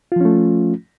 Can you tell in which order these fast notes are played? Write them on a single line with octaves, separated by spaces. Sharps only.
F4 F3 C#4 A3